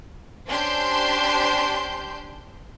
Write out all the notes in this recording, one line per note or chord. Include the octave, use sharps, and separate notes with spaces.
C#4 D4 G4 C5 C6 G6